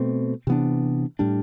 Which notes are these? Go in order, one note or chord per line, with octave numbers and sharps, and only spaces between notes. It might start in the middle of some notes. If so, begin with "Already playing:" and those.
Already playing: B2 A3 C4
C3 E3 B3 D4
A2 G3 D4